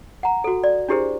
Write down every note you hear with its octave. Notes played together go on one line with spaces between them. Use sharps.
F#5 A#5
F#4 A4
D5
D4 E4 G4 G#4 A#4 C5